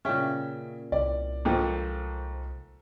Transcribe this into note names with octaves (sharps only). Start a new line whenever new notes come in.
A#2 C#3 C#4 E5 G5
C2 D5
G#2 D#3 F3 A4